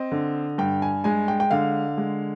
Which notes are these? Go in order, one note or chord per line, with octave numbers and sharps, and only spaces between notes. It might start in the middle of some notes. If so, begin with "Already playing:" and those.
Already playing: C4 D#5
D3
G2 G5
G#5
G#3 G#5
G5
G5
D3 F5
G#3